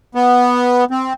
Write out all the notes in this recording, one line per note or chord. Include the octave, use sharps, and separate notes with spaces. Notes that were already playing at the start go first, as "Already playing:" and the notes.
B3
C4